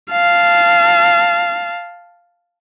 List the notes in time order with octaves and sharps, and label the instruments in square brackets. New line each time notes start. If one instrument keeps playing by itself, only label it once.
[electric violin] F5 A5